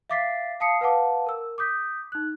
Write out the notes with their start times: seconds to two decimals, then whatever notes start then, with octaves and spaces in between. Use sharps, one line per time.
0.10 E5 F5 D6 A6 B6 C7
0.60 F5 A5 D#6 C7 C#7
0.81 B4 F5 F#5 A5 D6
1.27 A#4 E6
1.58 D6 D#6 G6 B6
2.12 D#4 F#6